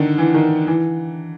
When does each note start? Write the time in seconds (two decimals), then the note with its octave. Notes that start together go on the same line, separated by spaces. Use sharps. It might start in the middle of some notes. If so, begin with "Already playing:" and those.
Already playing: D3 D#3
0.18 E3
0.34 D#3
0.67 E3